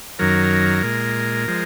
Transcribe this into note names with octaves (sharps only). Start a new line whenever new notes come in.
F#2 D#3 F#3 A#4
A#2 G#3
F3 G#3